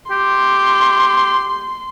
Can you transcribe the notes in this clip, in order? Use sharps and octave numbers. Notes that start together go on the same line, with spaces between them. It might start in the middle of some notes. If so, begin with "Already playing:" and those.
G4 C6